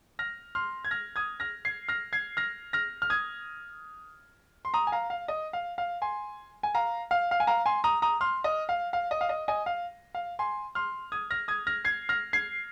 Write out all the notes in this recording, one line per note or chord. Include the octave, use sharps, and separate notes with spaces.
F6 A#6
C6 F6
G#6
F6 A#6
D#6 G#6
F6 A#6
G#6 C7
F6 A#6
G#6 C7
F6 A#6
F6 A#6
F6
D#6 G#6
C6
A#5 D#6
G#5
F5 A#5
F5
D#5
F5
F5
G#5 C6
G#5
F5 A#5
F5
F5
G#5
F5 A#5
G#5 C6
A#5 D#6
A#5 D#6
C6 F6
D#5
F5
F5
D#5
F5
D#5
D#5 G#5
F5
F5
G#5 C6
C6 F6
D#6 G#6
F6 A#6
D#6 G#6
F6 A#6
G#6 C7
F6 A#6
G#6 C7